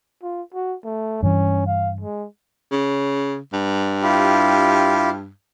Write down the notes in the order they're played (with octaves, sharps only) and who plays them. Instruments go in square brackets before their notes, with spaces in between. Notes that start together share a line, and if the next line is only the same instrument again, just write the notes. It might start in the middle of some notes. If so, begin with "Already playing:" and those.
[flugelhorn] F4
F#4
A3
[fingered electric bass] G2 E3 [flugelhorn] C#4
[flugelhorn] F5
G#3
[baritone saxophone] C#3
G2
[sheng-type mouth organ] E4 F4 G4